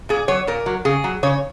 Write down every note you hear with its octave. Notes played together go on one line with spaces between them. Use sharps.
A#2 G#4
F#3 C#5
A#2 A#4
F#3
C#3 G#4
F#3
C#3 C#5